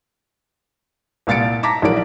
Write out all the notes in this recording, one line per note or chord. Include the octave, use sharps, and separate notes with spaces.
C2 A#2 F5 A6 C#7 D7
A5 A#5 D6 A#6 B6
A#1 E3 F#3 A#4 D5 D7